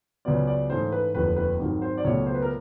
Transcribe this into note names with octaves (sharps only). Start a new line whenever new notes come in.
C#2 C#3 F#3 B3 D5
D5
G#2 E3 A3 C#4 C5
B4
F1 D#2 D3 F3 B4
B4
G#1 G#2 D#3 F#3
C5
D5
C#2 B2 F#3 A3 C#5
C5
B4
A#4